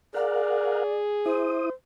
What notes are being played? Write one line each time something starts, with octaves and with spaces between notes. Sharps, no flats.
G#4 A#4 D5 F5 F#5
E4 C5 D#6